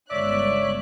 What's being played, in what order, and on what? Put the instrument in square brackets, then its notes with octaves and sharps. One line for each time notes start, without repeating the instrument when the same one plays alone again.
[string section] G1 C#2 F#6 [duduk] C#5 [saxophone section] D5 [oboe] E5